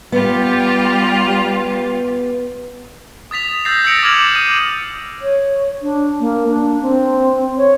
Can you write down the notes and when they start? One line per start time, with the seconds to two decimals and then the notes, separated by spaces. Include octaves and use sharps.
0.12 G3 B3 F4 G4
3.31 D#6 A6 B6 F7
3.65 D#6 E6 G6 A6 A#6 C7
3.84 E6 A6 A#6 C#7 D7 F7
4.03 D6 F6 G#6 E7 F#7
4.35 D#6 D#7
5.22 C#5
5.82 D4
6.20 A#3
6.49 D4
6.82 C4
7.57 C#5